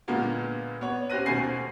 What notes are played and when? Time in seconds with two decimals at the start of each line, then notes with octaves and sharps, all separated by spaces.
0.08 A#2 D3 G#3 A#3 B3 F4
0.81 B3 C#5
1.10 C#4 G4 C5 F#6 A#6 D#7
1.26 D#2 B2 A3 C5 G#5 C7